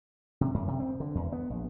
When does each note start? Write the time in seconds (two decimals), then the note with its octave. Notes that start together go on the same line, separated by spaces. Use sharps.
0.41 C3
0.54 F#2
0.68 C3
0.80 C4
1.00 D3
1.15 E2
1.32 B3
1.50 A#1